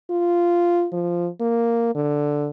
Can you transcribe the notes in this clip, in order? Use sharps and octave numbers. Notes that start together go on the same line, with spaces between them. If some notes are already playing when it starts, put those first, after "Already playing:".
F4
F3
A#3
D3